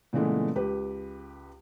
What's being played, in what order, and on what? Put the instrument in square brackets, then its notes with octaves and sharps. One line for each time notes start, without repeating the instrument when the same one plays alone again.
[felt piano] A#2 C#3 E3 G#3 A3 B3
C#2 G4 B4